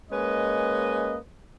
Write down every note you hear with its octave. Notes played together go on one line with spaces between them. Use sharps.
G#3 A#3 C#4 B4 D#5